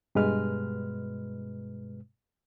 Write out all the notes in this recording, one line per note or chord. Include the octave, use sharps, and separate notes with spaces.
G2 B2 G#3 B4 F6